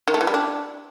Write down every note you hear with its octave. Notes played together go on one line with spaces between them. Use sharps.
D#3
A3
E3
G3
D4